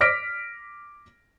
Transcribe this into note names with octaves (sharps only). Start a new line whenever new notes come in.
D6 F6 A#6 B6 D7